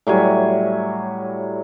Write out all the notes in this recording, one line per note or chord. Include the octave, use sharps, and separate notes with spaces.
A2 F#3 G3 G#5